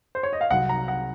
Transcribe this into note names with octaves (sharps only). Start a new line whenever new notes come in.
C5
C#5
D#5
F5
C2 C3 F#3 F#5
A#5
F#5